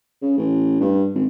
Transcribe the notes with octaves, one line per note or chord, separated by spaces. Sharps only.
C#3
A1
G2
G#1